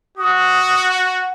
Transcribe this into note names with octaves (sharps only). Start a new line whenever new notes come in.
F#4 D#6
F#5